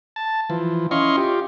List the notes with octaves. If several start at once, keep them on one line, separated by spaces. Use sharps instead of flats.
A5
E3 F3
C#4 E4 D#5 F5 C6 C#6
F4 G4